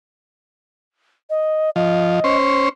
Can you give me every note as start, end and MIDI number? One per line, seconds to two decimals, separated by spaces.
1.30 1.70 75
1.76 2.20 53
1.76 2.36 75
2.24 2.69 61
2.24 2.69 72